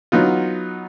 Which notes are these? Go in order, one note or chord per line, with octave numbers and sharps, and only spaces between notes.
F#3 B3 D#4 F4